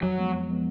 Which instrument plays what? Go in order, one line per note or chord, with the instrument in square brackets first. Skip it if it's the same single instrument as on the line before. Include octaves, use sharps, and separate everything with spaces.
[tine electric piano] F2 [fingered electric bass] F#3
[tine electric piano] F3 G#3 B3
F2
F3 G#3 B3